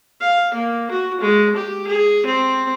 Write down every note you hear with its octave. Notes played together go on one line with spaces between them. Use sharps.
F5
A#3
F#4
G#3
G4
G#4
C4